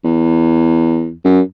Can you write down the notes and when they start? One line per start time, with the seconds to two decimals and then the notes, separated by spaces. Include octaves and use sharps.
0.05 E2
1.25 F#2